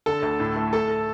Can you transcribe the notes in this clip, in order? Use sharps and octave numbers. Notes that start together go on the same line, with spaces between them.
D3 A4 A5
D2
A2
A3
A3 A4 A5